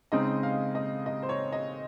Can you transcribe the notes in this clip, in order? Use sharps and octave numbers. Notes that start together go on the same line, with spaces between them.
C#3 G#3 C4 D#4 D#5
F5
D#5
D#5
C5
C#5
D#5